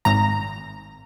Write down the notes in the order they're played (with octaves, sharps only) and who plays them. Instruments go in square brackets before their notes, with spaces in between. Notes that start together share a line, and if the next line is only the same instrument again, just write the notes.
[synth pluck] G#1 A#5